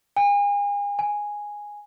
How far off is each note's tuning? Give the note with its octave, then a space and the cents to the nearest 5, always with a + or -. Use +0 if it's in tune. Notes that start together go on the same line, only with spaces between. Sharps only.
G#5 -40
G#5 -5